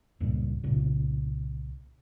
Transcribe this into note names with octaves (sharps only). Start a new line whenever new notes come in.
C#2 G2 A#2
C2 A#2 C#3